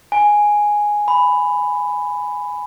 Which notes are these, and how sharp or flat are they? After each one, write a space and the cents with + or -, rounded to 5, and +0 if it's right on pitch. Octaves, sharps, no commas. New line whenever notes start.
G#5 +0
B5 +10